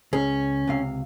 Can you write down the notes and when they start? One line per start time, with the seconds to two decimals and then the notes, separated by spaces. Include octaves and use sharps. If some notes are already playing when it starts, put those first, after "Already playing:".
0.13 C#2 C#4 G#4
0.67 C#2 C3 F5